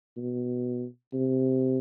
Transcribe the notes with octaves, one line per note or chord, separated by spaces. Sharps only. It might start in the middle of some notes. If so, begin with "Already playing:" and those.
B2
C3